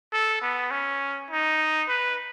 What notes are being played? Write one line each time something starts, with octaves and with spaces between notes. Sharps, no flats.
A4
B3
C#4
D#4
B4